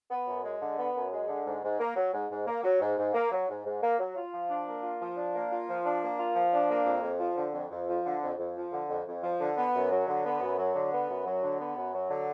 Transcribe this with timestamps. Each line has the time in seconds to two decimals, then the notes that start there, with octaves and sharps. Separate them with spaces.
0.09 B3
0.26 F#2
0.44 G#3
0.60 D3
0.78 B3
0.95 F#2
1.12 G#3
1.28 D3
1.45 G#2
1.63 G#2
1.79 A#3
1.95 F#3
2.13 G#2
2.30 G#2
2.47 A#3
2.63 F#3
2.80 G#2
2.97 G#2
3.14 A#3
3.31 F#3
3.48 G#2
3.65 G#2
3.82 A#3
3.99 F#3
4.15 F4
4.33 F3
4.49 D4
4.67 A#3
4.82 F4
5.01 F3
5.17 D4
5.34 A#3
5.51 F4
5.68 F3
5.85 D4
6.02 A#3
6.18 F4
6.35 F3
6.51 D4
6.69 A#3
6.85 F2
7.02 F2
7.19 F3
7.36 D3
7.53 F2
7.70 F2
7.88 F3
8.04 D3
8.22 F2
8.37 F2
8.55 F3
8.72 D3
8.89 F2
9.06 F2
9.22 F3
9.39 D3
9.56 B3
9.74 F#2
9.91 F#3
10.06 D3
10.25 B3
10.41 F#2
10.58 F#3
10.74 D3
10.91 B3
11.09 F#2
11.25 F#3
11.42 D3
11.59 B3
11.76 F#2
11.93 F#3
12.09 D3